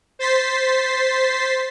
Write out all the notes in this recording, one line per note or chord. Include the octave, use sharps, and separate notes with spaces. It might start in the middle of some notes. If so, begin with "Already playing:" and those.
C5 A6 B6 C7